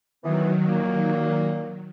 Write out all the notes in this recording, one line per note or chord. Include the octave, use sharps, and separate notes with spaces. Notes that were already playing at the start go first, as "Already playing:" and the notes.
D#3 E3 F#3 B3
A#2 A#3